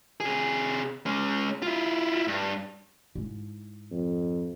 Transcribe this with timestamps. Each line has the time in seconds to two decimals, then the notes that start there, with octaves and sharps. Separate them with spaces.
0.20 C3 G#4
1.06 G#3 C#4
1.62 E4 F4
2.28 G2
3.15 G#2 E4
3.91 F2